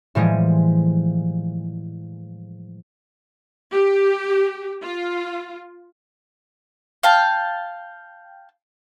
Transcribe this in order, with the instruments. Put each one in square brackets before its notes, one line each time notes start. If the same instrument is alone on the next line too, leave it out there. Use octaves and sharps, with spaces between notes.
[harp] A2 E3 F3 G3 G#3 G#4
[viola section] G4
F4
[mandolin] F5 G5 A5